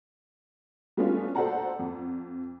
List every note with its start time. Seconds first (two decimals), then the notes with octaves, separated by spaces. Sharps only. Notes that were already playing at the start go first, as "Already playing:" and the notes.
0.97 G3 A3 B3 C#4 D4 F4
1.35 A4 C5 D5 F#5 A5 A#5
1.79 F2